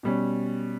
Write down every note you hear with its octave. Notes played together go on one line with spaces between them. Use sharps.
B2 G3 C#4